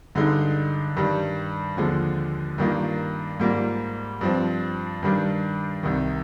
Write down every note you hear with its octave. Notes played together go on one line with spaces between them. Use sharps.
G2 D3 G#3 D#4
G2 D#3 G3
D#2 D3 F3 G#3
G2 D#3 A#3 F4
G#2 G3 A#3 F4
G2 F3 C4
G2 D#3 G3 D4
C2 C3 D#3